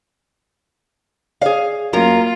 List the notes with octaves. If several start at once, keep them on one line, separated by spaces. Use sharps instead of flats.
G#4 C#5 D5 F5
F#2 F#3 A#3 F4 A#4 A#5